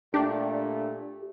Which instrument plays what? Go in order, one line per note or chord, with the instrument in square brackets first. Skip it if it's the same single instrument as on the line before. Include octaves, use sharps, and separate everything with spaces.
[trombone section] A#2 A3 [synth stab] D4 [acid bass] G4